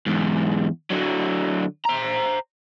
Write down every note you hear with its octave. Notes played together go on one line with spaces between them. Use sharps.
E2 G#2
D3 F#3
C5 A#5